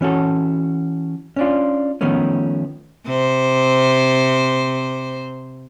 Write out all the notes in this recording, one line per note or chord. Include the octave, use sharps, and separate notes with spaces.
E3 C#4 F#4 A4
C#4 D4 F4
D#3 F3 A3 B3 C#4
C3 C5